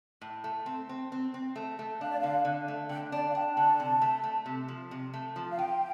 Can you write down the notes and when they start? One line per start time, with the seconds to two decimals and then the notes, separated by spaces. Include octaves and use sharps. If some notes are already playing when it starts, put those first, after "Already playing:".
0.21 A2
0.44 A3
0.66 C4
0.89 C4
1.12 C4
1.34 C4
1.56 A3
1.79 A3
2.01 D4 F5
2.09 D5
2.19 D3 F5
2.45 D3
2.68 A3
2.89 D3 G5
3.12 D4 D5
3.30 F5
3.35 D4 G5
3.57 D3 A5
3.80 C3
4.02 A3
4.24 A3
4.46 C3
4.68 F3
4.91 C3
5.14 A3
5.36 F3
5.51 F5
5.59 F4 G5